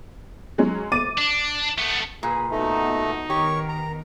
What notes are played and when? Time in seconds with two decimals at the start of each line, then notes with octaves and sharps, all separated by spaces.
0.58 F#3 G#3 C#4
0.92 D6 A6 D#7
1.18 D4
1.78 A3 B3
2.23 A#2 G#4 B4
2.51 A3 B3 D#4 F#4
3.30 D#3 B3 G4 A#4 C#5 C#6
3.69 A#5